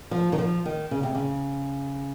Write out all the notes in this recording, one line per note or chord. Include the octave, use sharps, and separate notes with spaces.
F3
D#3
F3
D#3
C#3
C3
C#3